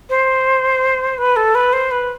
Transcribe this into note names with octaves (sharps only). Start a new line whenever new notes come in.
C5
B4
A4
B4
C5
B4